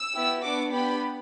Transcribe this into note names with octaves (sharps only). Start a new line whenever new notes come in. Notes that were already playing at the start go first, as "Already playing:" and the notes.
Already playing: E6
B3 E4 G4
B3 D4 F#4 D6
B3 D4 G4 B5